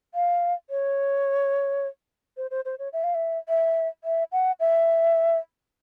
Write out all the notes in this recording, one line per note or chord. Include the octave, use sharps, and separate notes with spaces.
F5
C#5
C5
C5
C5
C#5
E5
F5
E5
E5
E5
F#5
E5